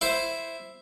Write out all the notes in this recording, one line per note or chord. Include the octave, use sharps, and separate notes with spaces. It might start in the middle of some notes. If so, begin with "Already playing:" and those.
E4 C5